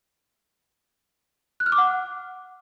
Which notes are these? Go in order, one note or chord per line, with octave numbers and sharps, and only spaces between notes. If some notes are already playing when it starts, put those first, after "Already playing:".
F#6
F6
D6
F#5